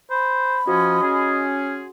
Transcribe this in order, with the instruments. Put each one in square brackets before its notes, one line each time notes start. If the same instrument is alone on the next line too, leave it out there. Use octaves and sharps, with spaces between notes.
[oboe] C5 [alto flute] B5
[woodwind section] F3 C#4 [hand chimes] F#4 [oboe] D#5
[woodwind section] C#4 G#4